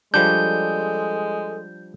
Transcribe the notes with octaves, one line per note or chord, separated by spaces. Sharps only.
F3 G3 G#3 D4 A4 G6